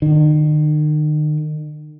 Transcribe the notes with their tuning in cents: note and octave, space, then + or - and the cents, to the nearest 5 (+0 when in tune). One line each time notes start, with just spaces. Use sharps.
D#3 -40